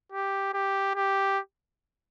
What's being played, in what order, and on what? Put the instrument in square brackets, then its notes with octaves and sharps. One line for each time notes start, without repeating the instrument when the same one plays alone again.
[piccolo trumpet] G4
G4
G4